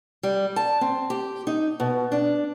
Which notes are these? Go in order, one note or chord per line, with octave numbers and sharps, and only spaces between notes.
G3
A5
C4
G4
D#4
B2
D4